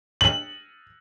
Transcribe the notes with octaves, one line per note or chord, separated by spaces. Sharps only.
F#7